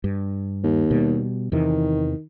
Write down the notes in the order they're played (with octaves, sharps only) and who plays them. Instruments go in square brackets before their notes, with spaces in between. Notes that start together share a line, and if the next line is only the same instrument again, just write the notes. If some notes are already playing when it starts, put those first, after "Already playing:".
[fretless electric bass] G2
[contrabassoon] D#2
[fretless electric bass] B2 G3
[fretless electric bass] E2 C3 E3 [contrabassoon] D#3